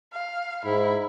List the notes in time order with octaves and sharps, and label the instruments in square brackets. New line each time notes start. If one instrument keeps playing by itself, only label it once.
[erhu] F5
[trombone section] G#2 [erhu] E4